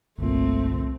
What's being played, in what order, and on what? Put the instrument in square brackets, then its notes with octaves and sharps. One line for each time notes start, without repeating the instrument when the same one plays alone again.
[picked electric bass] G1 A#2 [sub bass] C2 [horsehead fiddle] A3 C4